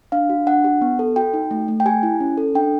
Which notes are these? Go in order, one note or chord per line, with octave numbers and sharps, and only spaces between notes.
D4 F5
F#4
D4 F#5
G4
B3
A4
F#4 G5
D#4
A3
A3
G5
G4 G#5
E4
C#4
A4
D4 G5